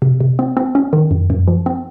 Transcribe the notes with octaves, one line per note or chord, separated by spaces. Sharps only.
C3
C3
C4
C4
C#4
D#3
F#2
F#2
F3
C4